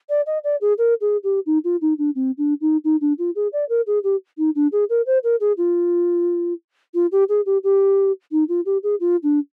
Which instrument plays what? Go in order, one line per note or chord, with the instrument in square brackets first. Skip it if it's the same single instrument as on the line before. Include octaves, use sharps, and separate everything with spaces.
[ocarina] D5
D#5
D5
G#4
A#4
G#4
G4
D#4
F4
D#4
D4
C4
D4
D#4
D#4
D4
F4
G#4
D5
A#4
G#4
G4
D#4
D4
G#4
A#4
C5
A#4
G#4
F4
F4
G4
G#4
G4
G4
D#4
F4
G4
G#4
F4
D4